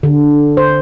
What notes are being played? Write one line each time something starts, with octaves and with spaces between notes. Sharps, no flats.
D3
C5